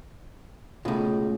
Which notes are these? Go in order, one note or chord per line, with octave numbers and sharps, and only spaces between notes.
C#2 B2 A3 C#4 F4